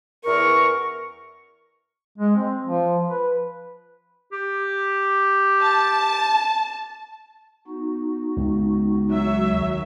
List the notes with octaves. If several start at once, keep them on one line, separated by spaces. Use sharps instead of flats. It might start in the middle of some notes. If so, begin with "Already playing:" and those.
E2 A#4 C#6
G#3
C4
F3
B4
G4
A5
B3 D#4 F#4
C#2
F#3 E5
D#2